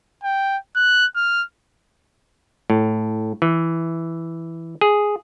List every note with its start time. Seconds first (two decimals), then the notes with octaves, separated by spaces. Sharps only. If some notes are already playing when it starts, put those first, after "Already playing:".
0.24 G5
0.76 F#6
1.16 F6
2.70 A2
3.42 E3
4.81 G#4